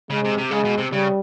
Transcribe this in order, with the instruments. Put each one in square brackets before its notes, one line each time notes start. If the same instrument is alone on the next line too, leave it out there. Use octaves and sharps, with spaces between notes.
[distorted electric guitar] C#3 [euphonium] G#3
[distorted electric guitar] C3
C3
[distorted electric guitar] C#3 [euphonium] G#3
[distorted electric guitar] B2
C3
[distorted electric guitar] C#3 [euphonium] G3